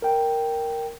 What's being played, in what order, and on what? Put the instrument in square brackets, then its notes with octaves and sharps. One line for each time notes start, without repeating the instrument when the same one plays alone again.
[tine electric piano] A#4 G5